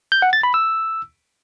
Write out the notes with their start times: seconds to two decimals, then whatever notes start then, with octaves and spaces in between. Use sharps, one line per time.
0.12 G6
0.22 F#5
0.33 A6
0.43 B5
0.54 E6